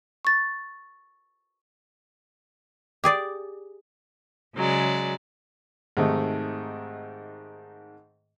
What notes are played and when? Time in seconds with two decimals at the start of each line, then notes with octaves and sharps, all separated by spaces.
0.25 C#6 A6
3.04 G4 G#4 D5
4.54 C#3 F#3 G#3 D5
5.97 G#2 C3 D#3 A3